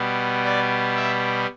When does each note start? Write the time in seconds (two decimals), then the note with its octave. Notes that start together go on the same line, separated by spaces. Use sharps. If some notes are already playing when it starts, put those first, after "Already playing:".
Already playing: B2 G3 B3
0.44 D5
0.96 E5